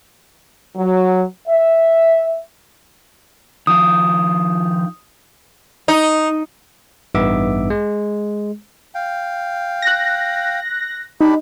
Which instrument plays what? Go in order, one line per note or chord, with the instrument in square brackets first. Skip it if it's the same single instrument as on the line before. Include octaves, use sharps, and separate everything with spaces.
[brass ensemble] F#3
E5
[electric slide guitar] D#3 F3 F4 [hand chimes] D#6
[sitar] D#4
[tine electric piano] A1 G2 B3 D#4 E5 D6
G#3
[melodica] F5 G5
[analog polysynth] F#6 A#6
[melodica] D4 G4 B5 [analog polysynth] D#4